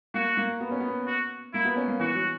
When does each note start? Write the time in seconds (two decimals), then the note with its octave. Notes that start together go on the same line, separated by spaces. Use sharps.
0.14 A#3 F#4
0.37 A#3
0.60 B3
0.71 C#4
0.80 B3
1.07 F#4
1.54 A#3 E4
1.65 B3
1.76 C#4
1.88 A#3
2.00 E3 F#4
2.15 F#3